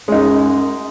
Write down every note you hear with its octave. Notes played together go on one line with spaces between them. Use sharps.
F#2 G#3 D#4